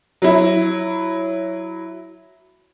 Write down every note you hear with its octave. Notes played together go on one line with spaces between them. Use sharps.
F#3 E4